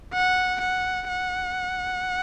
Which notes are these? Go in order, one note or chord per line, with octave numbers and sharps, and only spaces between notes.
F#5
F#5
F#5